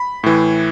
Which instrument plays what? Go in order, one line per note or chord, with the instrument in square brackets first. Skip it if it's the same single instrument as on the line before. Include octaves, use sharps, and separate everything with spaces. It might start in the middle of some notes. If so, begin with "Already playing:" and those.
Already playing: [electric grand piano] B5
A2 E3